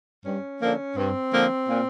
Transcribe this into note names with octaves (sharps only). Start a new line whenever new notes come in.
G2 C#4
D3 F3 A#3
G2 C4
D3 F3 A#3
A#2